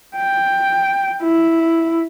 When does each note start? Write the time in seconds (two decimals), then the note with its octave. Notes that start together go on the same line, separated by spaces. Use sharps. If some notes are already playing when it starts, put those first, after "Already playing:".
0.16 G5
1.22 E4